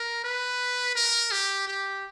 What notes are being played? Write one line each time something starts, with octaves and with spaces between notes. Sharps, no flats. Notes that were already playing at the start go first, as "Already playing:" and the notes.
Already playing: A#4
B4
A#4
G4
G4